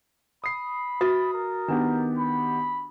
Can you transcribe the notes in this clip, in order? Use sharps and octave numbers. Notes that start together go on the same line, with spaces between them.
B5 D#6 C7
F#4 B4 E5 D#6 A6
A#4
D#3 B3 D4 G4
B5